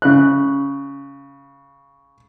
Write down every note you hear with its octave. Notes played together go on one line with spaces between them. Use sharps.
C#3 F#6